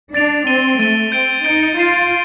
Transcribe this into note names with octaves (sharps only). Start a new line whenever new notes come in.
D4 A6 D7 F7
C4 A6 D#7 G7
A3 A6 D#7 G7
C4 G6 D7 G7
D#4 G6 D7 G7
F4 A6 C7 D#7